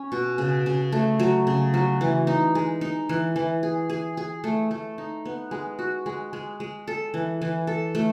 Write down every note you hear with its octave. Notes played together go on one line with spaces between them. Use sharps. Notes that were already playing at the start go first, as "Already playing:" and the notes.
Already playing: C#4
B2
C#3
C#3
A3
F#3
C#3
F#3
E3
D#4
G#3
D#4
E3
E3
G#4
G#4
G#4
A3
A3
D#4
B3
G#3
F#4
G#3
G#3
G#3
A4
E3
E3
A4
A3